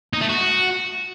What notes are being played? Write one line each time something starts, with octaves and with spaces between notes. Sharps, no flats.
D#4
A3
F#4